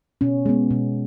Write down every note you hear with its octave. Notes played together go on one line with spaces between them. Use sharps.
B2 C#4
G#3 B3
B2